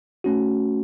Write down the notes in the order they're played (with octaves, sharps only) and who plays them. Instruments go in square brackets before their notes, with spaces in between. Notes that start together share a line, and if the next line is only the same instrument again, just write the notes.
[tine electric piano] A3 C#4 F#4